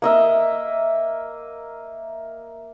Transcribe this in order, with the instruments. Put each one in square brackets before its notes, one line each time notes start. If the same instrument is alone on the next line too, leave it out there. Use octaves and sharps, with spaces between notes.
[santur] A#3 D#5 E5